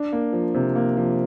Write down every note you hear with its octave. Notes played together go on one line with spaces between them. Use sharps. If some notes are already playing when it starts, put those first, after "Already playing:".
Already playing: D4
A#3
F3
C3
A#3
F3